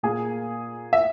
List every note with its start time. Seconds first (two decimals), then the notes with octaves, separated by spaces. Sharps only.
0.03 A#2 A#3 G#4 G#5
0.93 E5